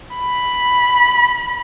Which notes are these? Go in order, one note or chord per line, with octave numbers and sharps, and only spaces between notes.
B5